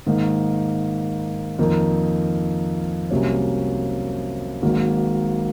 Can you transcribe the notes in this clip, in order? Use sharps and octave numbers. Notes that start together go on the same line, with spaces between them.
G#2 D#3 A#3 D#4
F2 D#3 A#3 D#4 A#4
C2 C3 F#3 A#3 C#4
G#1 G#2 D#3 F#3 A#3